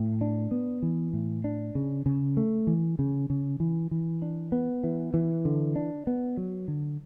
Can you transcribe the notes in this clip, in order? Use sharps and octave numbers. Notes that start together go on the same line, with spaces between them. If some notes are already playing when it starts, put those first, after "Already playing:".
Already playing: A2
D4
B3
E3
A2
D4
C#3
C#3
A3
E3
C#3
C#3
E3
E3
D4
B3
E3
E3
D3
D4
B3
F#3
D3